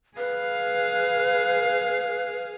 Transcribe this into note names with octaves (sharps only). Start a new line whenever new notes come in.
G#4 B4 F5